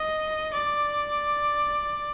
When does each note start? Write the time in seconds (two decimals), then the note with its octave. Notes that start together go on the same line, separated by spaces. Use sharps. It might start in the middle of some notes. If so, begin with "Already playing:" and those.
Already playing: D#5
0.54 D5